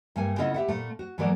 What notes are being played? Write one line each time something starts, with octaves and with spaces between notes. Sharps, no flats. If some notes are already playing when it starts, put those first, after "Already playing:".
G2 A3 A#3 G#5
C#3 B3 E4 F4 A4 D#5
G4 E5 F#5
A#2 A3
F#4
G#2 E3 F#3 A#3 A4 D5